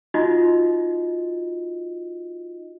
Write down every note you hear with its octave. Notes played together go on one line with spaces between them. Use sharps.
D#4 F4 F#4 D#5